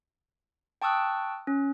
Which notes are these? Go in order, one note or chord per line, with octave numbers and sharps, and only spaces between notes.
G5 A5 C#6 D#6 E6 F#6
C#4